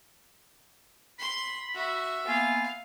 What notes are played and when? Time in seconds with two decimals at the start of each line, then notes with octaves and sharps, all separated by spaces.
1.19 B5 C6
1.74 F#4 E5
2.27 A#3 B3 F4 F5 G#5